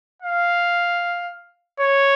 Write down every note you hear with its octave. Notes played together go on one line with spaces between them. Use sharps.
F5
C#5